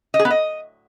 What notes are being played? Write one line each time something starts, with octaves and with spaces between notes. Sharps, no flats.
D#5
G#4
B3
D#5